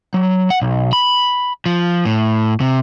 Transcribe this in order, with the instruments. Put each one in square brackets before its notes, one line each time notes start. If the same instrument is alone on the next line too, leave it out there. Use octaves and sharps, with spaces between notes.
[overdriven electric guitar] F#3
F#5
B1
B5
F3
A2
C3